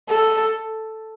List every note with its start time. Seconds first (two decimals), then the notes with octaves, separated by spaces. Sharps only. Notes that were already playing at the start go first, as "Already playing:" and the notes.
0.10 A4